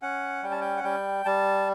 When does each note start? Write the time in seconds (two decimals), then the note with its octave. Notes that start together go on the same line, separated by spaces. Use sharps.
0.02 C#4 F#5
0.43 G3 G5
0.51 A5
0.61 G5
0.77 F#5
0.84 G3 G5
1.25 G3 A5